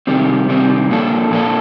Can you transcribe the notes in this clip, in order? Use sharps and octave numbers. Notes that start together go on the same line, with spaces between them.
C3 D#3 G3 C4
C3 D#3 G3 C4
A#2 F3 A#3 D4 A4
A#2 F3 A#3 D4 A4